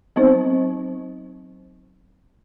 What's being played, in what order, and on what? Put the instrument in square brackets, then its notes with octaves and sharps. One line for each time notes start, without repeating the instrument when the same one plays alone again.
[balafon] F#3 B3 C4 D#4 C5